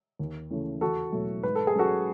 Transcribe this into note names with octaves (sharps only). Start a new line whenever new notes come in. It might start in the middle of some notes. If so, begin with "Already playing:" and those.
D#2
C#3 E3 A3
E2 F#4 A4
B2 F#3 A3
G#2 B4
A4
G#4
F#3 C#4 F#4 A4